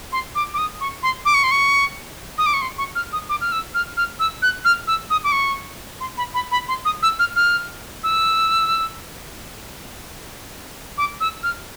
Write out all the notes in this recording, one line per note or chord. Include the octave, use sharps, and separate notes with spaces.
C6
D6
D6
D#6
C#6
C6
D6
C#6
C6
C#6
D#6
D6
C#6
C6
C#6
F6
D#6
D6
F6
E6
F6
F6
E6
F#6
F6
E6
D#6
D6
C#6
C6
B5
B5
B5
C6
D#6
E6
F6
F6
E6
D6
E6
F6